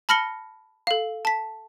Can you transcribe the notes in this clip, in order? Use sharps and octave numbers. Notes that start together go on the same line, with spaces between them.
A5 B5 F6 A#6 C#7 G7
A4 F5
A5 B6